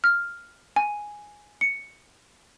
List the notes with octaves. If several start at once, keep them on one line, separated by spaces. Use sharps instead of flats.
F6
G#5
C#7